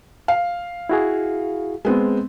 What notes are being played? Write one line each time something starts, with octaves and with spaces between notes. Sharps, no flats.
F5
E4 F#4 G#4
G#3 B3 C4